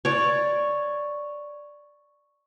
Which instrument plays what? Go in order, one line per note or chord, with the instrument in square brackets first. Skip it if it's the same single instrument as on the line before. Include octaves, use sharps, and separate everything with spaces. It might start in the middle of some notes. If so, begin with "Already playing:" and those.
[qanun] C#5 D5